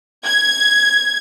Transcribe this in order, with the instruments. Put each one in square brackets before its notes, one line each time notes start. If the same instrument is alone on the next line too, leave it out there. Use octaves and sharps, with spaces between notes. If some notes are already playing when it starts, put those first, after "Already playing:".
[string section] G#6